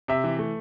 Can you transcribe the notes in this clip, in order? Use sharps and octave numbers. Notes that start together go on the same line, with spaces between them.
C3 E5
E3
A3